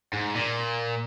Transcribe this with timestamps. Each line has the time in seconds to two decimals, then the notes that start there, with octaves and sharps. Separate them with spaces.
0.13 G#2
0.35 A#2